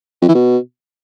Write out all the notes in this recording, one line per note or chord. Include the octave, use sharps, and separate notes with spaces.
F2
E3
B2